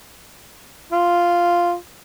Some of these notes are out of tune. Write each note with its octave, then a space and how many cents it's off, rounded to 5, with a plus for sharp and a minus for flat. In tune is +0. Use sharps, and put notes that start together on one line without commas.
F4 -5